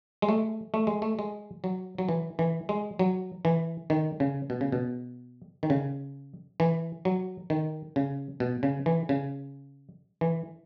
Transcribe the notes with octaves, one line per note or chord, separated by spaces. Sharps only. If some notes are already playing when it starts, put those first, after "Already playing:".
G#3
A3
A3
G#3
A3
G#3
F#3
F#3
E3
E3
G#3
F#3
E3
D#3
C#3
B2
C#3
B2
D#3
C#3
E3
F#3
D#3
C#3
B2
C#3
E3
C#3
E3